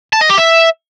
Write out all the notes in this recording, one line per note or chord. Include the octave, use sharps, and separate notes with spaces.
A5
D#5
G4
E5